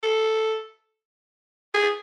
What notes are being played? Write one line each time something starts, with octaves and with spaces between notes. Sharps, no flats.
A4
G#4